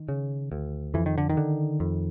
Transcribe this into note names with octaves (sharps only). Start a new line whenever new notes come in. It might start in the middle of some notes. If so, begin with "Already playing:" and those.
Already playing: D#3
C#3
D2
F2 E3
D#3
D3
D#3
D3
F2